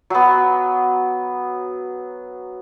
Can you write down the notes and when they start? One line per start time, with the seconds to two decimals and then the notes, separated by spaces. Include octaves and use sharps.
0.10 F#3 B3